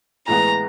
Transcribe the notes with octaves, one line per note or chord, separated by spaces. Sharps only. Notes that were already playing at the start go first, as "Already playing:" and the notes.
A2 E3 G#3 B3 A#5